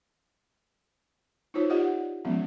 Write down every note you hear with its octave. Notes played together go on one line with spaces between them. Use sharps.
D#4 F4 F#4 C5 C#5
F4 G4 D5 D#5 F#5
E3 F3 G#3 B3 C#4